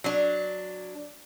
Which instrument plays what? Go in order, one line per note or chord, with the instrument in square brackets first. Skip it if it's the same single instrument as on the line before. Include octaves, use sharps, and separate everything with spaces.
[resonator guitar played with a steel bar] F#3 D4